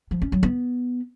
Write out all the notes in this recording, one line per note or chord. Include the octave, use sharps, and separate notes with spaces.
F3
C#4
F#3
B3